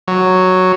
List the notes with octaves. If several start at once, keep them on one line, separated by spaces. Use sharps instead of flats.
F#3